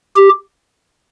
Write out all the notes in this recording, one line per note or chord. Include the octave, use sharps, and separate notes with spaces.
G4